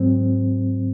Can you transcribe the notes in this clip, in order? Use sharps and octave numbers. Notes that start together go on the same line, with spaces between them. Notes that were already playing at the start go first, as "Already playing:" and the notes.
Already playing: G#2 F#3 C4